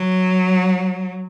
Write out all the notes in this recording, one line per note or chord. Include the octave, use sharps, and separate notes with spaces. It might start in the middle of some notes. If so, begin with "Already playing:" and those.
Already playing: F#3